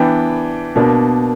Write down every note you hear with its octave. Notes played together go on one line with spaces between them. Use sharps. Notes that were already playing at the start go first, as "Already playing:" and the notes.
Already playing: E3 B3 D4 G5
B2 A#3 D4